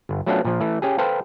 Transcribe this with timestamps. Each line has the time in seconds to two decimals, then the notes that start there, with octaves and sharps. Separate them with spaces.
0.09 G1
0.26 F#3 A3 B3 C#4 D4 F4
0.45 A#2 F3
0.61 E3 A3
0.82 C#4 G4 G#4
0.98 A4 B4 C5 F5 G5 A5